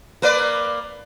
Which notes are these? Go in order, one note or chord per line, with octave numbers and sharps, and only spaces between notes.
A#3 B4 D5